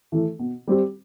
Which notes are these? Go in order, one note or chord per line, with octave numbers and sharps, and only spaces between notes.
E3 A3 E4
B2
G3 C4 G4